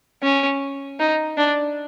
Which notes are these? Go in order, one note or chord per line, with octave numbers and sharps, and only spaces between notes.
C#4
D#4
D4